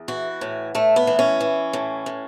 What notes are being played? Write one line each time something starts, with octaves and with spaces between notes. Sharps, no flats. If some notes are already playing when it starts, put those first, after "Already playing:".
Already playing: E2
E3 F#4
A2
A2 A3
B3
E3
C#4
E3
A2
A2